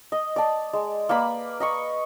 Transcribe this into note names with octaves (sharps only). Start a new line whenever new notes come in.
D#5
D5 A5
G#3
A#3 B4 D5 B5
D#5 B5 C#6